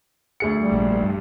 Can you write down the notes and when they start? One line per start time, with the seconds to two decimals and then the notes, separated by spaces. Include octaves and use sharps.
0.40 D2 G#4 C#7
0.57 G3
0.72 A#1 A#2
1.03 G2